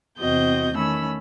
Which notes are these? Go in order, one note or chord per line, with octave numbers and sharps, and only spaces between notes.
E2 C3 C4 F#4 D#5 G6
D#3 A3 C#4 B5 E6